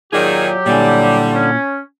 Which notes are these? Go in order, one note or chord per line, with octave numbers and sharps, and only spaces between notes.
D#3 F#3 F4 G4 G#4 D5
A#2 D3 G3 E4 G#5
C#4